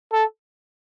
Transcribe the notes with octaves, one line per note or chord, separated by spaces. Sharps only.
A4